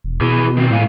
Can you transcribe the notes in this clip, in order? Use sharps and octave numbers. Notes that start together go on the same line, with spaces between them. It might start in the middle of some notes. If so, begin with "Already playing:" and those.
E1
B2 E4 G#4
D#3 C4
A2 G#3 F5 G#5